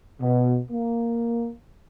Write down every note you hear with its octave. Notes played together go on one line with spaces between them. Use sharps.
B2
A#3